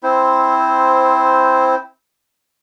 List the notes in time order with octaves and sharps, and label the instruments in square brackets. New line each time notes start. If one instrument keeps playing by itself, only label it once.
[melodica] C4 E4 C5